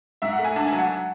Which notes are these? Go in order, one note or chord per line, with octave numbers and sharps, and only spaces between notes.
G#2 E5
F#5
A3
G#5
D4 A5
G#5
F#3
F#5